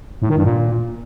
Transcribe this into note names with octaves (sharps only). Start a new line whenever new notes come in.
A2
D#3
G2
A#2